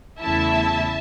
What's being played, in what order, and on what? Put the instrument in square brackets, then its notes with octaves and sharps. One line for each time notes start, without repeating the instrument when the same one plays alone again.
[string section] E2 C#3 A3 E4 E5 A5